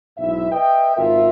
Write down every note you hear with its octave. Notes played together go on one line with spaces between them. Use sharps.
B1 G#2 E4 E5
B4 D#5 E5 G5
G#1 B2 F4 A#4 E5